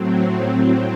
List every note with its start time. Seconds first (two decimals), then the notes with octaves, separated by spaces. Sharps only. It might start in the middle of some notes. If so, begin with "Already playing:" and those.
Already playing: A2 F#3 C4